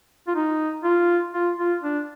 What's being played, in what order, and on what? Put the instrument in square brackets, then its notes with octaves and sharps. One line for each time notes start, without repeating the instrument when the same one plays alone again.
[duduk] F4
D#4
F4
F4
F4
D4